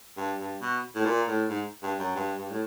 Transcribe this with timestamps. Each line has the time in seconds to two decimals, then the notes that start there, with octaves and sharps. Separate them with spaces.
0.17 G2
0.39 G2
0.61 B2
0.95 A2
1.05 A#2
1.28 A2
1.49 G#2
1.83 G2
1.99 F#2
2.16 G2
2.38 G2
2.50 A2